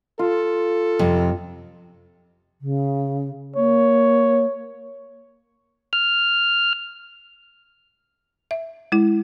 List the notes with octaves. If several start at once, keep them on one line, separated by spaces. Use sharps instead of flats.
F4 A4
F2 C3
C#3
A#3 C#5
F6
E5
G#3 E4